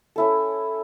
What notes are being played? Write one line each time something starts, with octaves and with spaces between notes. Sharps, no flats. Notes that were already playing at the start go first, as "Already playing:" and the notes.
C#4 E4 A4